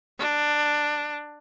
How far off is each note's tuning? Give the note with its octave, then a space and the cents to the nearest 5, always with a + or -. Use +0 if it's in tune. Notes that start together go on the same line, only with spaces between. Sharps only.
D4 +10